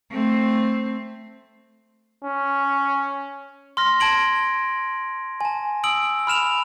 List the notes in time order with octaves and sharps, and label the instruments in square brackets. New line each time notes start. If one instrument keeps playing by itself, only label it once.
[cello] A3 C4
[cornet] C#4
[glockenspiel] C6 F6 A#6
A5 G#6 D7 F#7
G#5 A5
D#6 E6 D7 F#7
B5 F6 E7 F7